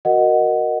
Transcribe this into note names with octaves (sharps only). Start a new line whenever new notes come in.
F#4 A#4 D#5 F#5